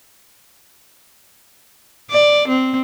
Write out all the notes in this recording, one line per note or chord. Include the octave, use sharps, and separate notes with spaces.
D5
C4